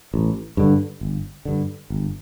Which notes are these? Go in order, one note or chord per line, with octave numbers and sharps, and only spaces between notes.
A1
G2 D3
G1
G2 D3
G1